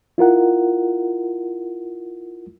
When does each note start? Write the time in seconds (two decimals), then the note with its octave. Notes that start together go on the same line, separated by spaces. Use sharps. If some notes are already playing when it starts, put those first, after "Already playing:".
0.18 E4 F4 A#4 F#5